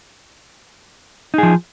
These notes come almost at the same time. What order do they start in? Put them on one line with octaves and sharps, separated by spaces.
D#4 G#4 F3